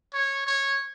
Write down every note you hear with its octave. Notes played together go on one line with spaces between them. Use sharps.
C#5
C#5